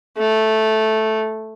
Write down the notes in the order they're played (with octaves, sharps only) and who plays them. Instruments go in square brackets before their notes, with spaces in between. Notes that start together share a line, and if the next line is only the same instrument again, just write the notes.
[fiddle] A3